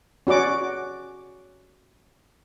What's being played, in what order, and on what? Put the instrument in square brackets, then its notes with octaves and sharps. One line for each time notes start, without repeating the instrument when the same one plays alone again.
[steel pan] C#4 F#4 D5 D6